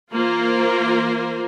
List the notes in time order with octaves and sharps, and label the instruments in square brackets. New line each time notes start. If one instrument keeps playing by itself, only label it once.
[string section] E3 A#3 F4 A#4 C5